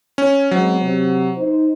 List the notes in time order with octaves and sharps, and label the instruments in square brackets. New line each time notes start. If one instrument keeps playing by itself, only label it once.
[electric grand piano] C#4
[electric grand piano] F#3 [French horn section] G#3 B3 C4
[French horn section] C3
D#4 C5